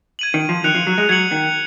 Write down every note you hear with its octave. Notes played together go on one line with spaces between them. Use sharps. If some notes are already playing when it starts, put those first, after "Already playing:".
G#6 D#7 F#7
D#3
F3
D#3 F#6 C#7 F7
F3
F#3
G#3
F#3 G#6 C#7 F#7
D#3